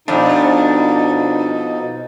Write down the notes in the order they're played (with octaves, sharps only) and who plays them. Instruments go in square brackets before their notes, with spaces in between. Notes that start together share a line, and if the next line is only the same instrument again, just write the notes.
[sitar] F2 [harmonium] B2 D#4 [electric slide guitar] D4